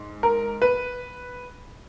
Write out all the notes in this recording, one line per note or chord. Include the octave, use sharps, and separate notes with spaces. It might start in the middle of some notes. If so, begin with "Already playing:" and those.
Already playing: G#2
A#4
B4